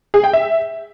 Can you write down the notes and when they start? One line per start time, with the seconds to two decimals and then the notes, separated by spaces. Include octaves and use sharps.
0.14 G#4
0.24 G5
0.33 E5